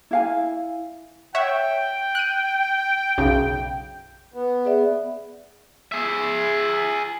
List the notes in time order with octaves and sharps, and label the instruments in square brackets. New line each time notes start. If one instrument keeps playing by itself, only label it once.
[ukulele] E4 F5 G#5
[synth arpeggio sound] C#5 E5 F#5 [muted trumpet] G5
[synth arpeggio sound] F#6 D#7
B1 F#2 C#3
[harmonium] B3
[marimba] G#4 D5 E5
[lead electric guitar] G#4 E5